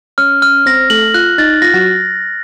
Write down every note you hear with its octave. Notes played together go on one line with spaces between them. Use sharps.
C#4 C#5 F6
F6
C4 C5 A#6
A3 A4 F#7
F4 F#6
D#4 A6
F4 A#6
F#3 F#4